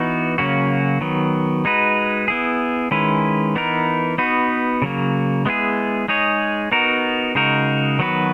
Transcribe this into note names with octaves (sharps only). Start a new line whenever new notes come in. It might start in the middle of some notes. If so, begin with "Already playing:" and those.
Already playing: E3 B3 D#4 F#4
C#3 F#3 A#3 C#4 F#4
D#3 F#3 B3
G#3 D#4 F#4 B4
B3 E4 G#4
D#3 G#3 C#4 E4 B4
E3 B3 D#4 A#4
B3 D#4 F#4 B4
C#3 F#3 A#3
G#3 B3 E4 G#4
G#3 D#4 G#4 C#5
B3 D#4 F#4 A#4
C#3 G#3 D#4 F#4 A#4
D#3 F#3 B3 F#4 B4